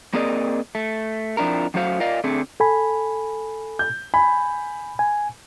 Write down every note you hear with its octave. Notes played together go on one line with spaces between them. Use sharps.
A#3 C4 G#4 A#4 D5 D#5
A3
F2 F3 D4 E4 A#4
F#2 F#3 A3 F#4 C5 F5
F4 A#4 D5 D#5 F5
D3 A3 C4 G#4
A4 G#5 B5
G6
G#5 B5
G#5